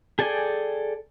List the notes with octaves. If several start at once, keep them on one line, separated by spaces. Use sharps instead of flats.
G#4 A4 D5 G5 G#5